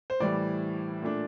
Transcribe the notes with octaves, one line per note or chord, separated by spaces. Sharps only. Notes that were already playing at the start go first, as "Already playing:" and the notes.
C5
A2 E3 G3 D5
A#2 A3 D4